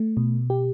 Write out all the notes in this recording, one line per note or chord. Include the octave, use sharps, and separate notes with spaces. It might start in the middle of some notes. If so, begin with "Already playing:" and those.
Already playing: A3
B2
G4